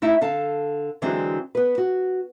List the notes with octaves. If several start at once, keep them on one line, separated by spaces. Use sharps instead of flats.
A3 D#4 E4 E5
D3 A4 F5 A5
D3 E3 F#3 G#3 C4 D4
B3 B4
F#4